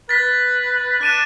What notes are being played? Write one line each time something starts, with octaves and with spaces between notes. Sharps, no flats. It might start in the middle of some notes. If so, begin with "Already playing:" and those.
B4 A6 B6
D4 F#6 D#7 E7